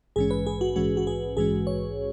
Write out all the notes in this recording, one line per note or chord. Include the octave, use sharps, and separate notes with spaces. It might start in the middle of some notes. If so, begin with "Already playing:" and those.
A#1 G#2 E3 G#3 C#4 G#4
B4
G#4
F#4
A#1 G#2 E3 G#3 C#4 F#4
F#4
G#4
A#1 G#2 E3 G#3 C#4 G#4
C#5